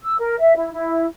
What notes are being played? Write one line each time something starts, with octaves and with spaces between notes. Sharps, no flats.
E6
A#4
E5
E4
E4